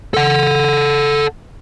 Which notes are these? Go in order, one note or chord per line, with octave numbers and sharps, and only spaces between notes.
A4 F#5